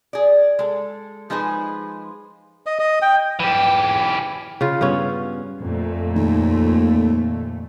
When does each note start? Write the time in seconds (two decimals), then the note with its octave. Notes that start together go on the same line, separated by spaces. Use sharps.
0.13 G#4 D5
0.59 G#3 A4
1.30 F3 G#3 D#4 G#4 B4 C5
2.66 D#5
2.79 D#5
3.02 G5
3.40 E3 G4
4.61 C#3 F4
4.81 G2 B3 C#4
5.61 F2 A#2 A3
6.16 D#2